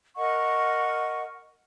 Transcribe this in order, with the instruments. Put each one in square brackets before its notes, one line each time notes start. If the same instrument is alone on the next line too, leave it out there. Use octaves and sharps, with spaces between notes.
[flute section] A#4 D#5 F#5 C#6